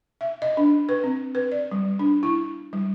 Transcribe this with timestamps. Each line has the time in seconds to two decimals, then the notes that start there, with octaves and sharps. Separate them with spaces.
0.21 E5
0.42 D#5
0.57 D4
0.89 B4
1.04 C4
1.35 B4
1.52 D5
1.72 G3
1.99 D4
2.23 E4
2.73 G3